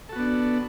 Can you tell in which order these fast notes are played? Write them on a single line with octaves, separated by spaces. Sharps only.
A4 F#4 B3 D4